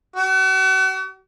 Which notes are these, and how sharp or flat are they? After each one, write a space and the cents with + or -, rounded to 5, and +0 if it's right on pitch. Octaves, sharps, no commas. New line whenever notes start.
F#4 +40